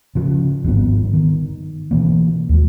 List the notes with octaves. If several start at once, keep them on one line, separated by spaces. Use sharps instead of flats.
C#3 F3
G#1 G2 G3 B3
D#3
B2 E3 A#3
D#2 G#3